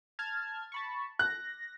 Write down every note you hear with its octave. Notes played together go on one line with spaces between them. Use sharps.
A5 F6 G#6
A5 B5 C#6
F#6 A#6